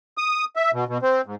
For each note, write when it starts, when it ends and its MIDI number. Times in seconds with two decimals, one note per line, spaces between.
0.18 0.45 87
0.56 0.71 76
0.73 0.84 47
0.88 0.98 47
1.02 1.21 60
1.26 1.35 44